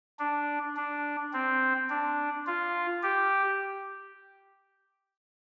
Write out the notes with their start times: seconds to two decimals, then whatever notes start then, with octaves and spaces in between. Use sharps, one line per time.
0.19 D4
0.77 D4
1.33 C4
1.90 D4
2.47 F4
3.03 G4